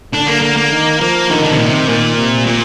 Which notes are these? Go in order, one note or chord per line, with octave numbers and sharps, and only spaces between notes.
D3 D4
A#3
A#3
A#3
D#3
F3 A#3
D3 D#3
D3
C3
A#2
C3
A#2 D#3
C3
A#2